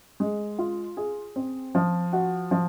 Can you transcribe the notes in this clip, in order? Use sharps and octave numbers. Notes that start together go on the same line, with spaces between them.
G#3
F4
G#4
C4
F3
F#4
F3